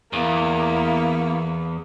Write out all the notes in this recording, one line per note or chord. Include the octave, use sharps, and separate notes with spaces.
E2 A#3 B3 E4